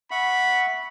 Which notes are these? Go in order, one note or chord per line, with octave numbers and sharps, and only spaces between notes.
E5 F#5 B5 C#6